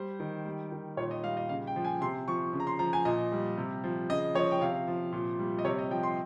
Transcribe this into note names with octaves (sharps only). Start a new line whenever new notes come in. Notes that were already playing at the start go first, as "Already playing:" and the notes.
Already playing: G3 C5
D#3
G3
D#3
A#2 C#5
D#5
G3 F5
D#5
C#3 F5
G5
F3
G#5
C3 C6
F3 C#6
C#3
A#5
C6
F3 A#5
G#5
A#2 D#5
G3
C3
F3
C#3 D#5
F3 C#5
G5
C3 F5
F3
A#2
G3
D#5
C3 C#5
D#5
F3 G5
C6